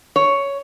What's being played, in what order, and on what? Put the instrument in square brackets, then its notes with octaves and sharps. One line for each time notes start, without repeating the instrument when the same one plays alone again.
[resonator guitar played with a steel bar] C#5